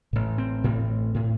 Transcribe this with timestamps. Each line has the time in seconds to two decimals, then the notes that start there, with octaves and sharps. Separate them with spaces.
0.13 A1 A2
0.38 C4
0.64 A1 A2
1.15 A2